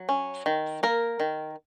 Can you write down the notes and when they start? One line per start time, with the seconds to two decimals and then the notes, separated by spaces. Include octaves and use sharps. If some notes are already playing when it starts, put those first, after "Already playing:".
Already playing: F#3
0.09 C#4
0.46 D#3
0.83 A#3 A#4
1.20 D#3